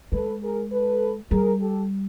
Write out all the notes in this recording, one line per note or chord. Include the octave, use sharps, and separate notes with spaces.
G#3 A4 B4
G#4 A#4
A4 B4
G3 G#4 A#4
G4 A4